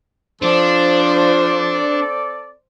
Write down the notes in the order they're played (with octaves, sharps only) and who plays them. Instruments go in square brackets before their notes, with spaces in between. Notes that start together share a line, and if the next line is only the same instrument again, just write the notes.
[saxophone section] F3 [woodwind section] C4 A4 D5 [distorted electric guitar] D4 [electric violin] C5